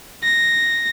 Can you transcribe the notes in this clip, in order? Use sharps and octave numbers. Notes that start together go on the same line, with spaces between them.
A#6